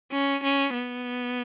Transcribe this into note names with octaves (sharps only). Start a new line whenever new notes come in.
C#4
C#4
B3